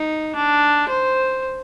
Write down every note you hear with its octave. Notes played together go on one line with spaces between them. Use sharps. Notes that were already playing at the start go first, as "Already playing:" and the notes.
Already playing: D#4
D4
C5